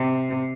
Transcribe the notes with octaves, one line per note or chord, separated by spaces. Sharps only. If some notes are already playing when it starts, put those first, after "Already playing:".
Already playing: C3